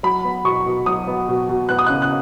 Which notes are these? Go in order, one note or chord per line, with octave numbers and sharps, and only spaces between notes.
F#3 B5
B3
B2 C#6
B2
F#3 D#6
B3
B2
B2
B3 F#6
D#6
C#3 F#6
F#6